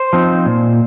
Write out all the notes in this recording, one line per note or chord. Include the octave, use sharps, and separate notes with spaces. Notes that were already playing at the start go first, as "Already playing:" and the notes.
Already playing: C5
F3 C4 D#4
A#2